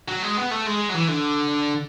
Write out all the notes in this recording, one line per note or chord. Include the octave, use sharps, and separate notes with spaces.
F#3
G#3
B3
A3
G#3
F#3
E3
D3